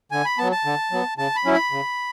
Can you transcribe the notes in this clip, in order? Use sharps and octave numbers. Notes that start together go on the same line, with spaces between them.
D3 G#5
B5
F#3 B3 A5
A5
D3
F#3 B3
C#3 A5
B5
F#3 C#4 E4
B5
C#3